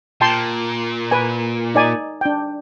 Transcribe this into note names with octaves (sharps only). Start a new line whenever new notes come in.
A#2 G5 A5 C6
B4 G#5
D#4 D5 G#5
D4 G5